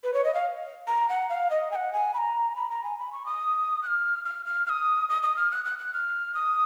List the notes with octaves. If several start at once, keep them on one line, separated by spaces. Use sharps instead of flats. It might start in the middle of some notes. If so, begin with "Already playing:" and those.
B4
C#5
D#5
F5
A#5
F#5
F5
D#5
G#5
F#5
G#5
B5
A#5
B5
A#5
G#5
B5
C#6
D#6
F#6
F6
F6
F6
F6
D#6
D#6
D#6
F6
F#6
F#6
F#6
F6
D#6